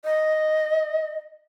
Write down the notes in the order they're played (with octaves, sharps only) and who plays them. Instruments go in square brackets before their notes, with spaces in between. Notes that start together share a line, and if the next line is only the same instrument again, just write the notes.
[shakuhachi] D#5